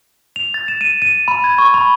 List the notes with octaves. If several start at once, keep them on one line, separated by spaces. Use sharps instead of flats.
F7
A6
E7
D#7
D#7
B5
G#6
C#6
B5